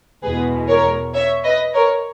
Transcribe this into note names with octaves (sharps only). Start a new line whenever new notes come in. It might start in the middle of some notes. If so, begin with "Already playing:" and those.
E2 B2 G#3 G#4 B4
A#4 C#5
C#5 E5
B4 D#5
A#4 C#5